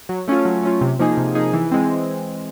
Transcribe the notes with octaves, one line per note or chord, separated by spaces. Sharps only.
F#3
A3 C#4 F4
F#3
A3 C#4 F4
C3
F3 A#3 D#4 G#4
C3
F3 A#3 D#4 G#4
E3
G#3 C4